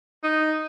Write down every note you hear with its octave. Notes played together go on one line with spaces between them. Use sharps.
D#4